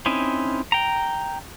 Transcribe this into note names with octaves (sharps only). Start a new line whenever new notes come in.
C4 C#4 D#4 E4
G5 A#5